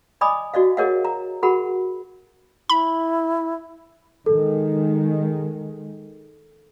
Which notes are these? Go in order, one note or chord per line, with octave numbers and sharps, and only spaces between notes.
D5 D#5 G#5 B5 D6 D#6
F#4 D5 D#5 F5
G#4 A#4 C#5 D#5 F5 F#5
A#5
F#4 G#4 A#4 F#5 B5
E4 B5
D#3 G#3 A4